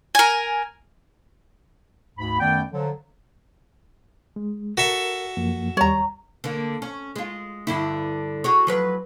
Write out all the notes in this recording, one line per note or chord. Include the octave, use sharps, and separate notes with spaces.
A#4 G#5
D2 G#2 B5
F#2 D#3 A3 B3 D5 G5
D3 F3 F#3
G#3
F#4 A4 A#4 E5
F#2 F3 A#3
D#2 G3 C#5 A#5
D3 A#3
C#4
G#3 F4
G2 D3 E4
F#4 G#4 C#5
F3 F#3 B4